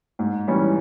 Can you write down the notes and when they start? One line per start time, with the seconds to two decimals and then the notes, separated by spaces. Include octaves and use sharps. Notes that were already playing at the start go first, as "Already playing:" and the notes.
0.19 G#2
0.47 E3 G3 C#4